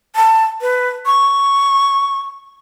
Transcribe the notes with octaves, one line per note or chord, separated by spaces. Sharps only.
A5
B4
C#6